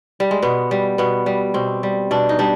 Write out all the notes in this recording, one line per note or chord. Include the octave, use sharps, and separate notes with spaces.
G3
G#3
B2 B3
G3
B2 B3
G3
B2 C4
G3
B2 D4
D#4
G3 D4